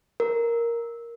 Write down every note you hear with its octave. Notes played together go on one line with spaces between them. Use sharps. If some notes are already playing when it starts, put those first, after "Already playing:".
A#4